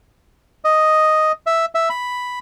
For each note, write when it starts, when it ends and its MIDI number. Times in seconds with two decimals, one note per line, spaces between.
0.65 1.32 75
1.46 1.65 76
1.75 1.89 76
1.90 2.39 83